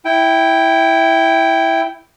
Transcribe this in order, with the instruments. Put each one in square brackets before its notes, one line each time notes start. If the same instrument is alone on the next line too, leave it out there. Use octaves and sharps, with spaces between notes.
[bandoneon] E4 G5